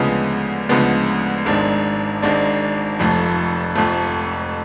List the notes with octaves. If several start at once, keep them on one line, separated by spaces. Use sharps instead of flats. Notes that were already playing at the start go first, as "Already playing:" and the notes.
Already playing: D2 C#3 F3 G#3 B3
D2 C#3 F3 G#3 B3
G#1 G#2 G#3 D4
G#1 G#2 G#3 D4
F1 F2 F3 A3
F1 F2 F3 A3